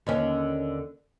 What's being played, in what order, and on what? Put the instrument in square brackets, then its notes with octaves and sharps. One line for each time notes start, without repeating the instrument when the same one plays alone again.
[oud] D#2 D3 C#4